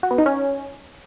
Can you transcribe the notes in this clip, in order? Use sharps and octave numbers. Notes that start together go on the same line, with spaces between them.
F#4
B3
D#4
C#4